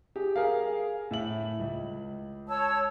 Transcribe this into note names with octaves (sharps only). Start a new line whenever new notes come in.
G4 G#4
G#4 A#4 F5
A2 E5 F#7
C#2
C#5 A5 E6